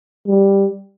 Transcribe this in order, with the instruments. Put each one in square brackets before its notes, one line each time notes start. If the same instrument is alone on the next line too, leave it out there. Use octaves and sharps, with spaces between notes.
[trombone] G3